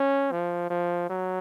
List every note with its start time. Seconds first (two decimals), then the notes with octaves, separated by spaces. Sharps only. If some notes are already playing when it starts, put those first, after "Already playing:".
Already playing: C#4
0.32 F3
0.70 F3
1.10 F#3